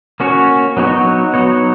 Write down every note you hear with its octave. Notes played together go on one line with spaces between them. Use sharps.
A#3 C#4 F#4 C#5
F#3 B3 D#4 F#4 C#5
F#3 B3 D#4 F#4 C#5